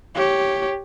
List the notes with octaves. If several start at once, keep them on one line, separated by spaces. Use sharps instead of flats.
G4 C#5